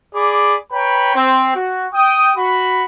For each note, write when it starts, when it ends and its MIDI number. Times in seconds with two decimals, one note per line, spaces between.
0.15 0.56 68
0.15 0.56 74
0.15 0.56 83
0.15 0.56 86
0.72 1.14 71
0.72 1.14 73
0.72 1.14 79
0.72 1.14 82
0.72 1.14 83
1.15 1.53 60
1.56 1.87 66
1.94 2.32 79
1.94 2.32 87
2.36 2.85 66
2.36 2.85 83